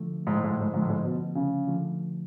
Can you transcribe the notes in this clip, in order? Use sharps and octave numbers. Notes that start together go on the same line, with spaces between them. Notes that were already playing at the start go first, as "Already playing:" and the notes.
Already playing: D3 F3 A3
G#2
A2
G#2
A2
G#2
G#2 D3 F3 A3
A2
G#2
B2
C#3
D3 F3 A3